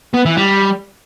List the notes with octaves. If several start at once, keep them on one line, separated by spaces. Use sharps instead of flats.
B3
E3
G3